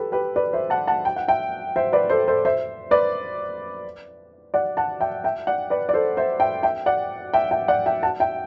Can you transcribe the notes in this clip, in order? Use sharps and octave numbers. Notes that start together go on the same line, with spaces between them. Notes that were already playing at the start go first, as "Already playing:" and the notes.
Already playing: G4 A4 B4
G4 B4
B4 D5
C5 E5
F#5 A5
F#5 A5
G5
F#5
E5 G5
C5 E5
B4 D5
A4 C5
A4 C5
C5 E5
B4 D5
D5 F#5
F#5 A5
E5 G5
E5 G5
D5 F#5
B4 D5
D5
A4 C5
C5 E5
E5 G5
E5 G5
D5 F#5
E5 G5
E5 G5
D5 F#5
E5 G5
F#5 A5
E5 G5